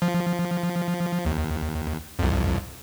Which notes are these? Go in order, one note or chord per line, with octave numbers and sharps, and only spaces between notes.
F3
D#2
C2 F2